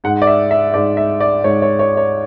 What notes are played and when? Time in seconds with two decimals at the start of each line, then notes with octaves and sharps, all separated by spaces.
0.04 G#2 G#3 F#5
0.22 D5
0.27 E5
0.51 E5
0.74 G#2 G#3 D5
0.97 E5
1.20 D5
1.44 G#2 G#3 C#5
1.62 C#5
1.79 C#5
1.97 C#5